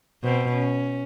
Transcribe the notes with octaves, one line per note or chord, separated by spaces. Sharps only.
B2 C4
C#4